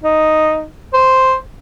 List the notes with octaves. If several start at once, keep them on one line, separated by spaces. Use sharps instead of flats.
D#4
C5